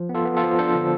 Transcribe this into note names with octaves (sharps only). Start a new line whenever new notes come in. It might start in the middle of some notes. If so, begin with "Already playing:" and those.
Already playing: F3
B3
F4 A4
B3
F4 A4
F3
D4 A4 C5
D3